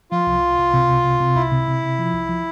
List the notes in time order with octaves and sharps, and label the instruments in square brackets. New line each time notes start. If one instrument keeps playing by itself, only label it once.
[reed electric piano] F3 [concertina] F4
[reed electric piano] C2
C2
C2
C3
C2
C3
C3
[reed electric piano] C2 [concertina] E4
[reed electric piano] C3
C3
C3
F3
C2
F3